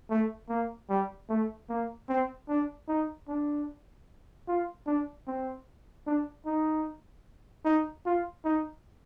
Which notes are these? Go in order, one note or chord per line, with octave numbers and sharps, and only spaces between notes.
A3
A#3
G3
A3
A#3
C4
D4
D#4
D4
F4
D4
C4
D4
D#4
D#4
F4
D#4